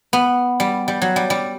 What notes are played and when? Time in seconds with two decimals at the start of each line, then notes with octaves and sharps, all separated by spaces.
0.13 B3
0.60 G3
0.88 G3
1.02 F#3
1.16 G3
1.30 G3